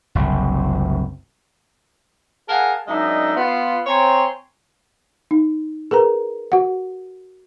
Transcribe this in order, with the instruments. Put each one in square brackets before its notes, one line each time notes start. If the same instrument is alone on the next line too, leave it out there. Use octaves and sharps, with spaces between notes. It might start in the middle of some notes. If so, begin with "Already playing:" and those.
[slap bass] F#1 C2
[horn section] G#4 A#4 F5 F#5 G#5 A5
F#2 G#3 D4 D#4 E5
B3 F4
C4 C#5 G5 G#5 A#5 C6
[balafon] D#4
G#4 A#4 B4 A#5
F#4 F#5